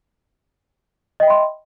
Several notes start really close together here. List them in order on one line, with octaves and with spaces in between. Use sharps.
D#5 G5 E5 B5 C6